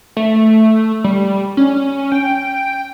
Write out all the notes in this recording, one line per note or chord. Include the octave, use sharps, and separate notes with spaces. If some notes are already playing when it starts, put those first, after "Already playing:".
A3
G3
C#4
G5